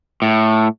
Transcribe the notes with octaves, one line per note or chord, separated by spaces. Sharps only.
A2